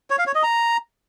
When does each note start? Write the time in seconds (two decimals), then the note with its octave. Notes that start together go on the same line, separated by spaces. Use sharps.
0.10 C#5
0.19 F5
0.27 C#5
0.35 D#5
0.43 A#5